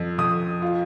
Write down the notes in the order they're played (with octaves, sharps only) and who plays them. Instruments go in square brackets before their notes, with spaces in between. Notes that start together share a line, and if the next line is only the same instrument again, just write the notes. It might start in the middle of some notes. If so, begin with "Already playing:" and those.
Already playing: [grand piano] F2
F2 D#6
F4